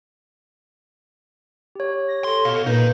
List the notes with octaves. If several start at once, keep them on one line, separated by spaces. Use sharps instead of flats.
G4 C#5
A#6
A4 C6
B2 F5
A#2 D#4 A#4 B4 G6